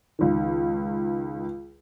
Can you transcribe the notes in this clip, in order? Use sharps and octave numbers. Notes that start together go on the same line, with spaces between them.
C#2 D#3